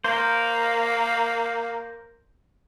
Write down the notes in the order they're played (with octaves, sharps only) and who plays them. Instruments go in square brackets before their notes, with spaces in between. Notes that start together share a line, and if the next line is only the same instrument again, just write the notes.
[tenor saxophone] A#3 [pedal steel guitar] A#4 C5